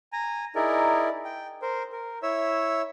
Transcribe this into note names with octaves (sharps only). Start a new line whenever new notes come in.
G#5 A#5
D#4 E4 G#4 A#4 D5
G5
A#4 C5
A#4
E4 C#5 E5 E6